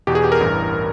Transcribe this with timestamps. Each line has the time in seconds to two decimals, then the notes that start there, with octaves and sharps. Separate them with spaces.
0.07 E2 B2 G4
0.15 G#4
0.24 G4
0.32 A#4
0.40 A1 G2 E3